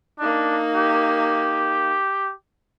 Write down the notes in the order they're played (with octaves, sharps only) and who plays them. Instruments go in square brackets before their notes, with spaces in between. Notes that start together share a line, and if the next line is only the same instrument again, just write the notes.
[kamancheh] A#3 D#4 [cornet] D4
[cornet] G4